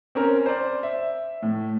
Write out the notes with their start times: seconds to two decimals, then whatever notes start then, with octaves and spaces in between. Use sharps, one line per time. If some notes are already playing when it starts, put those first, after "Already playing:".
0.15 C4 C#4 A#4
0.46 C5 D5
0.83 E5
1.42 A2